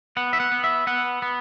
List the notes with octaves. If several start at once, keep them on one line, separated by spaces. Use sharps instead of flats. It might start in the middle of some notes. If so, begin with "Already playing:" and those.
B3 F#5
E5
F#5
B3
E5
B3 F#5
B3